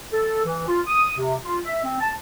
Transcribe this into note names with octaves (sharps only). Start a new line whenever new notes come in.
A4
E3
F4
D#6
C3
F4
E5
C4
A5